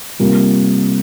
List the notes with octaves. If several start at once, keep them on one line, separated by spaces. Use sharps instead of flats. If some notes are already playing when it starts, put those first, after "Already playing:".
C3 G3 A#3 F4 A#4